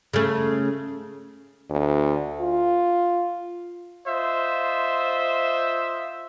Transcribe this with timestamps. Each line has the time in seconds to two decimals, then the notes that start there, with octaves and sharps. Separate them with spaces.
0.13 C#3 A3
1.70 D2
2.41 F4
4.07 F4 C5 D#5 E5